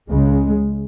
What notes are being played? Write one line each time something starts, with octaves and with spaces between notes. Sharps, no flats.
C#2 C#3 G#3